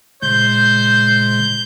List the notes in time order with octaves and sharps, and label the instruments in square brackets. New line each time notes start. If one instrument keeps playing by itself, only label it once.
[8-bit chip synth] A#2 C#3 G#3 [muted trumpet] C5 [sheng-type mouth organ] G6